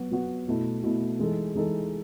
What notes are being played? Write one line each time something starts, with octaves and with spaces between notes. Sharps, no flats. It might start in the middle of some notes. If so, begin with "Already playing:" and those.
Already playing: F#3 B3 F#4
F#3 B3 F#4
B2 A3 E4
B2 A3 E4
E3 G#3 D#4 A4
E3 G#3 D#4 A4